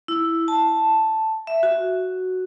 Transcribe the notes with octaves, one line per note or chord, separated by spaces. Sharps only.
E4
A5
E5
F#4